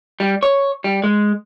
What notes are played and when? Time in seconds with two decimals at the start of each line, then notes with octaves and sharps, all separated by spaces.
0.20 G3
0.43 C#5
0.84 G3
1.04 G#3